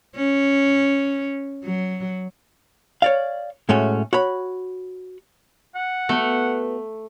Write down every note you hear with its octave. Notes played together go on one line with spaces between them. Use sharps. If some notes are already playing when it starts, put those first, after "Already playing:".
C#4
F#3
C#5 D5 F5
A2 G#3 A3 C#4 F#4
F#4 C#5 B5
F#5
A3 B3 F#4 B4